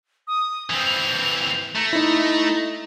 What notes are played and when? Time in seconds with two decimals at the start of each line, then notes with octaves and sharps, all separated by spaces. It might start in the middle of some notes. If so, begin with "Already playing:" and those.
0.27 D#6
0.70 E3 C4 F7
1.76 A3 A#5
1.93 D#4 E4